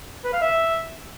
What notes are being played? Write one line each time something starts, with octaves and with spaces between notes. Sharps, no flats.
B4
F5
E5